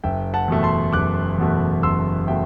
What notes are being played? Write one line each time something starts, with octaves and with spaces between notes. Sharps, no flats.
F#1 E5 G5
F#5 A5
E2 B2 A3
A5 C6
F#1 D6 F#6
E2 B2 A3
F#1 C6 E6
B2 A3 E5 G5